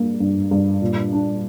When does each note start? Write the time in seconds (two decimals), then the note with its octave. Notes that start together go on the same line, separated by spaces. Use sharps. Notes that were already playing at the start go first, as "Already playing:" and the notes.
Already playing: G2 A#3
0.20 G2
0.51 G2
0.81 A#2
1.12 D4